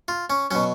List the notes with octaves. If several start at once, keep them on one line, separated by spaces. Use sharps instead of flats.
F4
C#4
B2 F#3 C#4